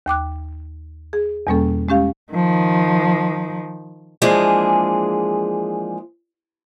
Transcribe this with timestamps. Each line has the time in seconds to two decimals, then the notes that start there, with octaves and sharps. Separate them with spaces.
0.06 D#2 G5 D6 F#6
1.13 G#4
1.47 E2 B2 G3 A#3 C#4 A4
1.89 G#3 C#4 G4 F5
2.33 D#3 F3
4.22 E3 F3 G#3 A#3 D4 G#4